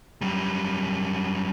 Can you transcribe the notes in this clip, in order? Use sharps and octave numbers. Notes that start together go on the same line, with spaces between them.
F#2 G3